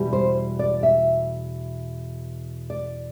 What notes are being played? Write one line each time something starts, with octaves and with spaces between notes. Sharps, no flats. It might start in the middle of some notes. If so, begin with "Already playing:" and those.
Already playing: E2 B2 G3
C5
D5
E5
D5